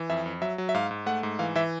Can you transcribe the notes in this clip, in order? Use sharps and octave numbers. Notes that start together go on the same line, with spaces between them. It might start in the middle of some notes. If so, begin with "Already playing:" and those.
Already playing: E3
F2 E5
F2
F#3 E5
F#3
E5
G#2 F5
G#2
A3 F#5
G#2
E3 F5
E3 E5